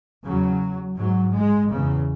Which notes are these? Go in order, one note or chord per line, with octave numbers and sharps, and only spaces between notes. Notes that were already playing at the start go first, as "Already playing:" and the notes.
E2 C#3 F#3
G#2 F#3
G#3
E2 C#3